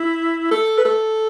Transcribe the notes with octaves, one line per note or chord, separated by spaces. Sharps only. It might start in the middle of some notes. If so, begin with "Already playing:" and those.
Already playing: E4
A4
B4
A4